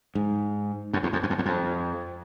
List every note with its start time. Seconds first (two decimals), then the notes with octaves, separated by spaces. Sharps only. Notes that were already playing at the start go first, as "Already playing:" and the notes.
0.15 G#2
0.93 F#2
1.03 E2
1.13 F2
1.23 F#2
1.30 F2
1.38 E2
1.46 F2